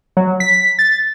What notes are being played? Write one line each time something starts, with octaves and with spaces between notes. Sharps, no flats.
F#3
B6
A6